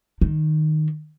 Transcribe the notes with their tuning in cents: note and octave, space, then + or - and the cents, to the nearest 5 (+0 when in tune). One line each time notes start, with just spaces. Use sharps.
D#3 -10